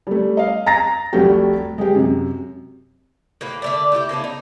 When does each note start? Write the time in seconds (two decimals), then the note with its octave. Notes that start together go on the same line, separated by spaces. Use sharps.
0.07 G3 A3
0.37 D#5 F5
0.66 A#5 A6 A#6
1.13 F1 C2 C3 A3 F#4 G4
1.78 G#3 G4
1.95 F#2 C3
3.41 A2 A#3 B4
3.62 D3 A3 D5
3.92 A3 E4 F#4 G4
4.09 C#3 A#3 B3 D4
4.24 D#4